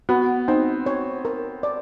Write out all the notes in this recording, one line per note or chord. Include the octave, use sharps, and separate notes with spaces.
B3 F#4
C4 D#4
C#5
A#4
D5